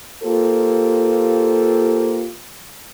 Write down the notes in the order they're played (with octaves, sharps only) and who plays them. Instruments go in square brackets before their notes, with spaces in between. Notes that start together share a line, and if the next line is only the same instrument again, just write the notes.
[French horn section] A#3 F4 G4 A4 C5